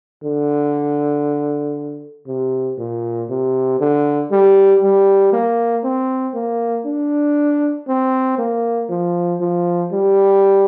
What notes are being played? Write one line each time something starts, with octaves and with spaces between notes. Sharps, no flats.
D3
C3
A#2
C3
D3
G3
G3
A#3
C4
A#3
D4
C4
A#3
F3
F3
G3